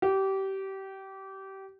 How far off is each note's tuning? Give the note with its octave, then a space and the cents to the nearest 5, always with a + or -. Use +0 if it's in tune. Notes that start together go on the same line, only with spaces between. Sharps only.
G4 -25